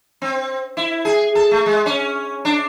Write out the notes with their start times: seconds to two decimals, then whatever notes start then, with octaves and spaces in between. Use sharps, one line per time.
0.22 C4
0.77 E4
1.05 G#4
1.35 A4
1.51 A3
1.66 G#3
1.86 C#4
2.45 D4